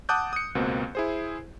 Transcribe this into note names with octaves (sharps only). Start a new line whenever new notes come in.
F#5 A5 D6 D#6 F#6 G6
D#6 C#7
C#2 B2 A#3 C4
E4 G#4 C5